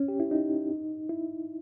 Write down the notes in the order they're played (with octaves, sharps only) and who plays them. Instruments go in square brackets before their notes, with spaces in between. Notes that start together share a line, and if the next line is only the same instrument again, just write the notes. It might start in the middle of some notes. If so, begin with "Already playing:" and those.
Already playing: [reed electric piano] C#4
G4
E4
D#4
E4